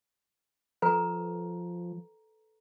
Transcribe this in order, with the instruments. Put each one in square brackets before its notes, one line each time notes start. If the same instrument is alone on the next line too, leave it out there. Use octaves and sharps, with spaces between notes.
[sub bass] F3 [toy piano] A4 B4 A#5